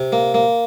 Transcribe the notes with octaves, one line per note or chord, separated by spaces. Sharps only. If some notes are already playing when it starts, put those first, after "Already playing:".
Already playing: C3
A#3
A#3